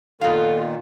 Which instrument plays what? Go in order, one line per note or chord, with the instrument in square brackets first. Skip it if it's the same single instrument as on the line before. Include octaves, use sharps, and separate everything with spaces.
[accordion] A#2 D#3 [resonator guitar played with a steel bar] B3 F5 [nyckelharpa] F4 [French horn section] A4